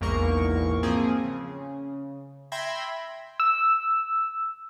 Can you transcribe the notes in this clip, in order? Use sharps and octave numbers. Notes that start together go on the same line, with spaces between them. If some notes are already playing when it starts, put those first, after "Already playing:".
A#1 E2 G#2 A#3 A#4 C#6
F3 A#3 C4 G#4
C#3
E5 G5 B5 C6 G#6 A#6
E6